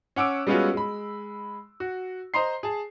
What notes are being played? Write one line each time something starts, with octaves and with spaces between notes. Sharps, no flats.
C#4 F#5 D6 E6 D7
G3 G#3 B3 C#4 F4 F#4
G#3 B5
F#4
C5 D#5 A#5 C6 C7
G#4 A5